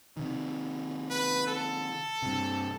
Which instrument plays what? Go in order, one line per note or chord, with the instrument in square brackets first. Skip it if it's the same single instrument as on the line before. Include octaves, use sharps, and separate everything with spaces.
[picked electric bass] C3 D#3
[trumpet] B4
A4
[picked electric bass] G2 C3